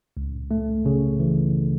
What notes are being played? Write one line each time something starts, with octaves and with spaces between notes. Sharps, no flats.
C#2
A3
C#3
E3